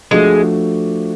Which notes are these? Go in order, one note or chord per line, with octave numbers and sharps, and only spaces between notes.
F3 G#3 A3 D4 F#4